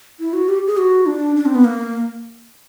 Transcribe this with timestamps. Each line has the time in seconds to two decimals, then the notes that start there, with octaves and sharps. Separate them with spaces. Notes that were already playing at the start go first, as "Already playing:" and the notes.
0.20 E4
0.33 F#4
0.48 G4
0.67 G#4
0.77 F#4
1.06 D4
1.36 D4
1.46 C4
1.55 B3
1.65 A#3